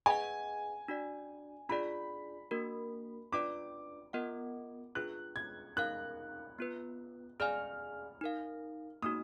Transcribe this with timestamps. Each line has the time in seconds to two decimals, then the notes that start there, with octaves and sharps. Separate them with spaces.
0.06 G#4 B4 D#5 F#5 G#5
0.88 D4 F#4 D5
1.69 D4 F4 G#4 D5 B5
2.51 A#3 D4 F#4 A#4
3.32 D4 F4 B4 D5 D6
4.13 B3 F4 A#4 D#5 F#5
4.95 D4 F4 G#4 B4 F#6
5.36 G#6
5.77 D#4 A#4 F5 F#6
6.59 B3 F4 B4
7.40 G#4 D5 F5 G#5 F6
8.21 D#4 A#4 F5
9.02 A#3 D#4 F#4 D#6